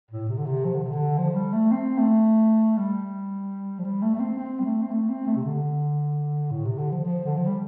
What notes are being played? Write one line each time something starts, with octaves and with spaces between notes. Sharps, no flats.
A2
C3
D3
C3
F3
D3
C3
D3
F3
G3
A3
C4
A3
G3
F3
G3
A3
A3
C4
C4
G3
A3
C4
A3
C4
A3
C3
D3
A2
C3
D3
F3
F3
D3
F3
G3